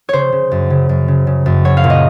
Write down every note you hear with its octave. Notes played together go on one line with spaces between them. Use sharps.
C#3 C5 C#5
C#3
F#2
C#3
F#2
C#3
C#3
F#2
F#3 C#5
F5
A#2
D#5